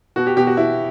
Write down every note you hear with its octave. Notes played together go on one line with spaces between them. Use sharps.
B2 F#4
G4
B2 G4
F#4
B2 E4